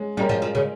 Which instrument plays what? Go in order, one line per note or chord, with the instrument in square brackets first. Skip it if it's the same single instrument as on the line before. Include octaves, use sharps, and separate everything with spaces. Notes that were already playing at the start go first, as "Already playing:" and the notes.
Already playing: [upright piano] G#3 C#4
[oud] G3 [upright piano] G#3 C#4 G4 A#4
[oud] F3
F3
C#3